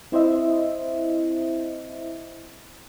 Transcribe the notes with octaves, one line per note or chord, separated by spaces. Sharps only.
C4 E4 C5 D#5 E5